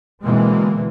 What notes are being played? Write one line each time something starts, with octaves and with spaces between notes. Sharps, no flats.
B2 D3 E3 G#3 A#3 C4